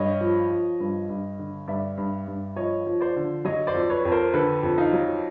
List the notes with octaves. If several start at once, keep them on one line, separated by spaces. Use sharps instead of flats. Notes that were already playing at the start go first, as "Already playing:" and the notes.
Already playing: G2 C#5 D#5
F3
F3
G2
G2
D3
G2 D5 E5
G2
G2
F3 C#5 D#5
F3
C5 D5
D3
F#3 C#5 D#5
C5 D5
F2
B4 C#5
F2
A#4 C5
D3 A4 B4
F2
D#4 F4
F#3